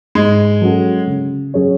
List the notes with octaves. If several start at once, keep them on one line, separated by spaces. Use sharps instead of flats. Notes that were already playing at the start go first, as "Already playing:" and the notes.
G#2 G#3
F#3 C#4 F#4 A4
C#3
F#3 C#4 G#4 C#5